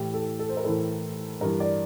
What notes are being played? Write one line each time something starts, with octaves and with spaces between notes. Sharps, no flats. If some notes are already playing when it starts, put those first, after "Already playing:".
Already playing: A2 E3 G4
A4
A4
C5
A#4
A2 E3 A4
G2 E3 A#4
D5